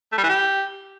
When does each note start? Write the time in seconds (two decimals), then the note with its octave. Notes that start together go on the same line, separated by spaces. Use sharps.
0.12 A3
0.18 G3
0.24 E3
0.29 G4